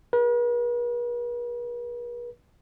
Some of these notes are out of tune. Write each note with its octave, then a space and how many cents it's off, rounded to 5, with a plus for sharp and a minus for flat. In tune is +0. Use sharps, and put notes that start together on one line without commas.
G#4 +0 B4 -45